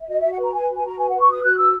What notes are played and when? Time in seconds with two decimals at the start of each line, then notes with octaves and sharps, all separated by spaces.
0.02 E5
0.09 F#4 D#5
0.20 F#4 E5
0.32 F#5
0.39 B4 A#5
0.54 B4 G#5
0.69 F#4
0.77 G#5
0.84 F#4 A#5
0.99 B4 G#5
1.09 B4 F#5
1.20 C#6
1.28 F#4 D#6
1.43 F#4 F#6
1.58 B4 E6